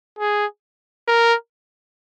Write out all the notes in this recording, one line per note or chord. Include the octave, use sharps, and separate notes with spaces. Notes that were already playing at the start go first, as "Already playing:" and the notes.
G#4
A#4